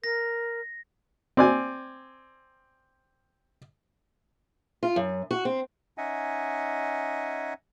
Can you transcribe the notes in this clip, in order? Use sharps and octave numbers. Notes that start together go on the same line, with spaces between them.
A#4 A#6
C4 D5 G#5
F4
F#2
F#4
C4
C#4 D#4 D#5 E5 F#5 G#5